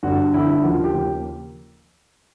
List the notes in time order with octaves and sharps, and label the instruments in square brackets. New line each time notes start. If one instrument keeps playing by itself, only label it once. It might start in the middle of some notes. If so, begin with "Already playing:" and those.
[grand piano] G1 G2 D3 F#4
G1 G2 D3 E4
E4
D#2 C#3 F3 A#3 F#4
F4
G4
D#2 C#3 F3 A#3